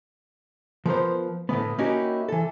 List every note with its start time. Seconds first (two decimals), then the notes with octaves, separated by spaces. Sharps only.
0.86 F3 B3 A#4 C5
1.49 A2 D3 A3 B3
1.78 A#3 C#4 D#4 E4 F#4 G4
2.28 E3 A4